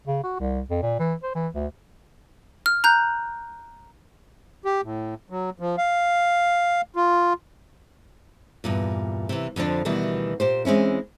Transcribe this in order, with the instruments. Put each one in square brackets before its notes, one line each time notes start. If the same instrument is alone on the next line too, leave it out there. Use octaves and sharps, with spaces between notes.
[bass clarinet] C#3
F#4
C2
F2
A#2
E3
C5
E3
D2
[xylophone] F6
A#5 F#6 G6
[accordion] G4
A2
F#3
F3
F5
F4
[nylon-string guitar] E2 G2 A#2
C3 E3
F2 D3 F3 D4
D2 B2 D#3 E3 G3
A#2 G4 C5
E3 G#3 C4 C#4 E4